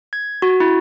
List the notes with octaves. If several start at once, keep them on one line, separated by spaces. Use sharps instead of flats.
G#6
F#4
E4